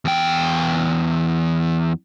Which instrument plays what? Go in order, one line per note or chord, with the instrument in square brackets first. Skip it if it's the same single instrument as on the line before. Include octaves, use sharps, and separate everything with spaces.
[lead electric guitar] E2 G5